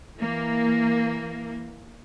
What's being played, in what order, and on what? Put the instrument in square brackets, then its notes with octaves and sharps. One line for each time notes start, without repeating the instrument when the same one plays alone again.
[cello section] E3 A#3